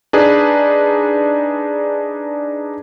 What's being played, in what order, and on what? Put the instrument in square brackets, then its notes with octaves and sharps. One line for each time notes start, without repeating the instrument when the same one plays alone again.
[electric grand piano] D4 D#4 G#4 B4